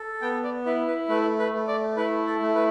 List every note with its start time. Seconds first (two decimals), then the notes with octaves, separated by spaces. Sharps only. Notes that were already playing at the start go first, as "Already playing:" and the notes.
Already playing: A4
0.22 B3 G5
0.43 D5
0.66 E4 B4
0.87 B4
1.09 A3 B4
1.39 B4
1.53 A3
1.67 D5
1.97 E4 B4
2.26 A4
2.40 A3
2.55 B4